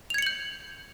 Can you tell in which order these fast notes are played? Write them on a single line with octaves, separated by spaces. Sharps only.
F7 G#6 C#7 F#7 G6